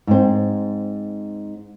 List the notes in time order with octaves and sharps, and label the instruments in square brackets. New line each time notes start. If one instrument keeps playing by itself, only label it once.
[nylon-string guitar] G#2 C4